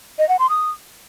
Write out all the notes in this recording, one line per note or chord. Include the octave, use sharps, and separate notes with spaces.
D#5
F#5
C6
D#6